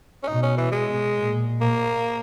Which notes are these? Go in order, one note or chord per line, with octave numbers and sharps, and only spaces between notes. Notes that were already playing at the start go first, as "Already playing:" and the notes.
C#4
B2 D#4
C#4
E3
G#3
A#2
A#2 A#3